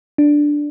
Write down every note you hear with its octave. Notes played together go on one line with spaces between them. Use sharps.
D4